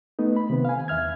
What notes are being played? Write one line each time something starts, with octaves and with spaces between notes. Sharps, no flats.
A3 B3 D#4
B5
C3 D#3 B3
F5 G#5
E2 E5 F6 G#6